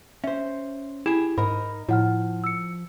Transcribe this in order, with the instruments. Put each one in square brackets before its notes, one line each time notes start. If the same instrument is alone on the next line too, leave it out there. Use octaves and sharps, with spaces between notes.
[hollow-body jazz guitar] C#4 C5 [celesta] E5
[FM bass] E4 [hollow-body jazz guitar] G4 G#4 [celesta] E7
[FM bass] G#2 [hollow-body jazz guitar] D#4 A#4 [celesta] B5
[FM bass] A2 [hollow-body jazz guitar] F3 [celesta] E4 F#5 F6
[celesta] E6 C#7